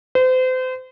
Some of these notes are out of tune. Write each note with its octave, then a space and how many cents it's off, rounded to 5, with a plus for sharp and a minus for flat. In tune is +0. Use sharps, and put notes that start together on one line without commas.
C5 -35